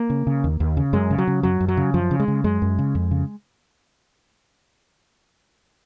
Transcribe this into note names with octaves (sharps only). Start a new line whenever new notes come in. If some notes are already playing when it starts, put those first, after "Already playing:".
Already playing: A#3
C#3
C#3
D#2
D#2
C#3
F#2 G#3
C#3
F#3
C#3
F#2 F#3
F#2
F#3
C#3
F#2 F3
C#3
G#3
C#3
F#2 G#3
F#2
C#3
F2
C#3